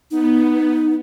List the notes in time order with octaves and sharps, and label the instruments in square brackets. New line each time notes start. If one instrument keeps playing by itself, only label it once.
[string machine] B3 [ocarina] D#4